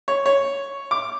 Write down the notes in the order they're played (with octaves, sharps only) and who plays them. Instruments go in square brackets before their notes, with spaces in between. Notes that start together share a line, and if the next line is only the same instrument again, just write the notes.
[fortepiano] C#5
C#5
D6